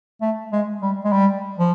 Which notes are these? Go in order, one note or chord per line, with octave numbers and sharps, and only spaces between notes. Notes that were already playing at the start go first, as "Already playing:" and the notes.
A3
G#3
G3
G#3
G3
F3